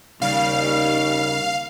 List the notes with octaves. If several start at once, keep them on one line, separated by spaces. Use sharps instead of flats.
D#2 C#3 G3 F5